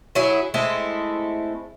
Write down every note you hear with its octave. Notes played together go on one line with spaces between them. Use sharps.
F#3 E4 G#4
G#3 A3 C4 E4